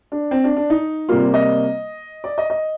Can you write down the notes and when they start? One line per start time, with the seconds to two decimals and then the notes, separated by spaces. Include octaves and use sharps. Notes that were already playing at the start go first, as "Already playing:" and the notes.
0.12 D4
0.31 C4
0.44 D4
0.57 D4
0.70 D#4
1.09 C3 G3 A#3 F4
1.34 D#5
2.24 D5
2.38 D#5
2.50 D#5